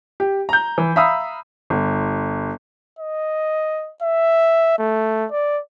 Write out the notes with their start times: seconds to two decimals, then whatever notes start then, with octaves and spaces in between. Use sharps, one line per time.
0.20 G4
0.49 A#5 G6
0.78 E3
0.96 E5 F5 A#5 B5 D#6 E6
1.70 G1
2.99 D#5
4.02 E5
4.79 A3
5.31 D5